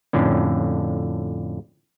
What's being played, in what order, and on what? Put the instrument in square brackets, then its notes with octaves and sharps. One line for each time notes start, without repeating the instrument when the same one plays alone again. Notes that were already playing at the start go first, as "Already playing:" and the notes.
[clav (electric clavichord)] F2 A2 D3 C#4